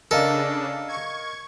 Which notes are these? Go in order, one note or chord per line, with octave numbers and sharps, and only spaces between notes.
C#3 D4 A4 A#4 D#5 F5
C#6 G#6